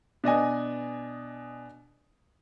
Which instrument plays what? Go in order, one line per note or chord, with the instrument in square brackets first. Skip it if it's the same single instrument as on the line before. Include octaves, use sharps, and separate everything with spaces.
[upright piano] B2 D4 D#5 G#5